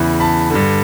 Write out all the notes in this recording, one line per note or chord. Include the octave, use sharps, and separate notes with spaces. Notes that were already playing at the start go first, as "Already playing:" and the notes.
Already playing: E2 C#3 E3
A5 B5
G2 D3